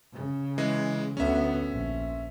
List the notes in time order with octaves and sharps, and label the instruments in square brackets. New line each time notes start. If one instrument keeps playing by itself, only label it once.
[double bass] C#3
[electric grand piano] E3 G#3
[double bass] D2 B3 [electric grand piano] C#4 E5
[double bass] A#1